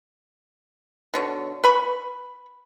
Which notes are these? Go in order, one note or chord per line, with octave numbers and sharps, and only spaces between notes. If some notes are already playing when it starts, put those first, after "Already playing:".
B2 D3 C#5
B4 B5 C#6